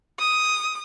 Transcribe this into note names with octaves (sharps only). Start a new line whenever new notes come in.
D#6